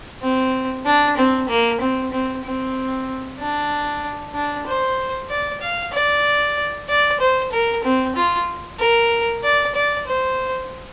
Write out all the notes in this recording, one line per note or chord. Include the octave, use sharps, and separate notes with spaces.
C4
D4
C4
A#3
C4
C4
C4
D4
D4
C5
D5
F5
D5
D5
C5
A#4
C4
F4
A#4
D5
D5
C5